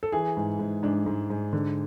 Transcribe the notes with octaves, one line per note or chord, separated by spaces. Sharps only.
A4
E3 G#4
G#2
G#2
G#2 D4
G#2
G#2
D3